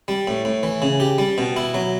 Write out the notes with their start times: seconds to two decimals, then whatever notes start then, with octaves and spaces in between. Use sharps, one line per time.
0.08 G3
0.28 A2
0.45 A2
0.63 E3
0.82 C#3
1.00 G4
1.18 G3
1.38 B2
1.56 E4
1.74 F#3